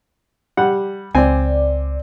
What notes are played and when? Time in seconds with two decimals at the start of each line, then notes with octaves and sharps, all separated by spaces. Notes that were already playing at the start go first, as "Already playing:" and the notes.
0.57 G3 F#5
1.15 C#2 C4 D5 G#5